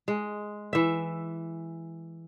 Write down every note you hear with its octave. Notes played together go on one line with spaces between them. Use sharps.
G#3
E3 E5